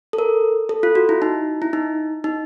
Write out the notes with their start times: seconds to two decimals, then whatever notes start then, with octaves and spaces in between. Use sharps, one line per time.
0.13 A4
0.18 A#4
0.69 A4
0.83 F4
0.95 F#4
1.09 E4
1.22 D#4
1.62 E4
1.73 D#4
2.24 D#4